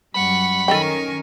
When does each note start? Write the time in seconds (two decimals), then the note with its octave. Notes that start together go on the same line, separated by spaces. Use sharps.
0.14 F#2 G3 F#5 B5 C#6
0.68 D#3 C#4 A4 A#4 D#5 G5 G#5 C#6